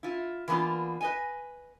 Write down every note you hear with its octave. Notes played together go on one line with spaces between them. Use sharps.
E4 F4
E3 A#3 B3 D4 F4
B4 D#5 G#5